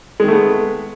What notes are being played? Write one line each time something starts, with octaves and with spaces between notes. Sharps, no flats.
D#3 G#3 A3 B3